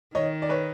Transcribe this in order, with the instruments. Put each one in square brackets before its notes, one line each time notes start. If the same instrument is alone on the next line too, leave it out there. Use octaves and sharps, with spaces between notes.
[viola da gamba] D#3 [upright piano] C#5 D#5
[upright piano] D5
B4 C#5